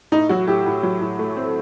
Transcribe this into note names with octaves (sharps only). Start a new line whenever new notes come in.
A2 D#4
F#3 F#4
A2 G4
A2
F#3
A2
A3
C4